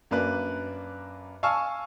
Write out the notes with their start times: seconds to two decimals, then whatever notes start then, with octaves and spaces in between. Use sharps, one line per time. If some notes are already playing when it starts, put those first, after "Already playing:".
0.11 F#2 A#3 D4 B4 F#6
1.43 F5 G#5 A5 C#6 E6 F6